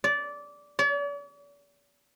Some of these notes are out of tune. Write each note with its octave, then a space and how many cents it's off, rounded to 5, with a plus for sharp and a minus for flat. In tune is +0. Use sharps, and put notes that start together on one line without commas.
D5 -15
D5 -45